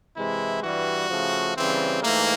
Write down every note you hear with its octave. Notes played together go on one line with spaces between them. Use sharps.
C3 E3 G#3 E4
G2 E3 G3 F#4
C#3 F3 A3
C#3 E3 G3 C4
G#2 E3 A3 A#3